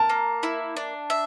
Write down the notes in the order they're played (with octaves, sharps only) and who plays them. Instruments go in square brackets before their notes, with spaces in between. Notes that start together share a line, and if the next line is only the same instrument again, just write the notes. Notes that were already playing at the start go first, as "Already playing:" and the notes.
Already playing: [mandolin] A#4 [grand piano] A5
[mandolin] A#3
E4
D4
E5